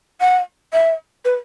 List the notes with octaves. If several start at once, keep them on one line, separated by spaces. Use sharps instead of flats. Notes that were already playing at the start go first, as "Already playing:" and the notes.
F#5
E5
B4